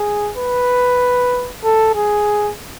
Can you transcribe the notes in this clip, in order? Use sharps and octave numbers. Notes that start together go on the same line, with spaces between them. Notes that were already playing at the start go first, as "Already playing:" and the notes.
Already playing: G#4
B4
A4
G#4